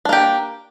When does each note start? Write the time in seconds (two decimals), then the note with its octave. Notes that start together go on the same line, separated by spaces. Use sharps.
0.05 D4
0.09 A#3
0.13 G4